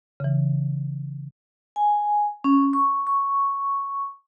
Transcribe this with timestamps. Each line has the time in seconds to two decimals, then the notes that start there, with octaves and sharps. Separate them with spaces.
0.20 C#3 E3
1.76 G#5
2.44 C#4
2.73 C#6
3.07 C#6